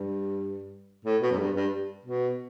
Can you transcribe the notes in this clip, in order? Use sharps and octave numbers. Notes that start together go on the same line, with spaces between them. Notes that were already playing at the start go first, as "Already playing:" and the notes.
Already playing: G2
A2
B2
F#2
G2
G2
B2